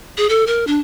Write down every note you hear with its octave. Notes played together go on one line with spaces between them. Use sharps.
G#4
A4
A#4
D4